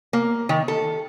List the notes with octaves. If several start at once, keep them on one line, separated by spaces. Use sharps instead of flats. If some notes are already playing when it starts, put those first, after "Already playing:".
A#3
D#3
A4